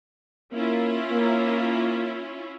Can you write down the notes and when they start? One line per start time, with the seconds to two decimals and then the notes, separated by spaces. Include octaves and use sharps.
0.53 A#3 C#4 E4 F4
1.12 A#3